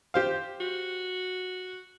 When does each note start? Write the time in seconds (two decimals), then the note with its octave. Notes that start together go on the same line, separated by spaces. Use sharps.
0.14 G4 C5 F5
0.61 F#4